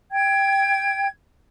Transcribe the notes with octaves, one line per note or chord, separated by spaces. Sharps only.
G5 G#6